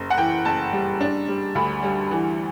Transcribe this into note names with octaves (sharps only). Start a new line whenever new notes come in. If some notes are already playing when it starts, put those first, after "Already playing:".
Already playing: F#1
F#5
E3 G5
F#1 A5
G3
D4
G3
D2 B5
G3
E3